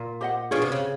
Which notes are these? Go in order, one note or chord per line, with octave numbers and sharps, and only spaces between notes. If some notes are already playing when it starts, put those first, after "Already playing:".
Already playing: A#2
G4 C5 D#5 F#5
B2 D4 F4 G#4 C#5
C3
C#3